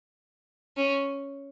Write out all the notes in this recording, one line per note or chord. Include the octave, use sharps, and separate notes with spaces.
C#4